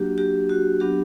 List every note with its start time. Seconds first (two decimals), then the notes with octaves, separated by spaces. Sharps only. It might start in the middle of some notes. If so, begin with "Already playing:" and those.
Already playing: F#3 A#3 D4 F#4 G4
0.18 G4
0.49 F#4
0.80 F#3 B3 D4 G4